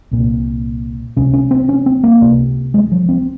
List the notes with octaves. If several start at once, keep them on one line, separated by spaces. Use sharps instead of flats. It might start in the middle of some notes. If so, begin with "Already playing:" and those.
C2 A#2
C#2 C3 C#4
C#4
C4
C#4
C4
A#3
C#2 C3
G#3
F3
C4